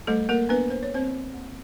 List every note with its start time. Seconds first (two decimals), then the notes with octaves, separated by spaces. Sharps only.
0.07 G3 A3 A4
0.29 A#3 A#4
0.49 B3 D4 B4
0.70 C5
0.83 C#5
0.92 G3 C4 C5
1.34 A#3